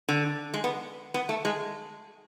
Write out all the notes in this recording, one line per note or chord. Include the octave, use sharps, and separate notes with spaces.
D3
G#3
B3
B3
A3
G#3